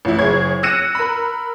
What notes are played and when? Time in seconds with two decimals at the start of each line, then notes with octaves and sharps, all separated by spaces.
0.05 A1 E3 E4
0.19 F#1 G#4 C#5 G#6
0.63 E6 F#6 A#6 C#7 D#7 E7
0.95 A#4 B5